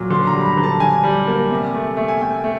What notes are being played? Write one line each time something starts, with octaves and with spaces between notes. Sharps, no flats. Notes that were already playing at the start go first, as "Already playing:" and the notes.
Already playing: A#2 F#3
D3 C6
A#5
G3
B5
A#5
D3
A5
D3 G#5
G3
A#3
C3
A3
A3
G#5
A3 G5
A3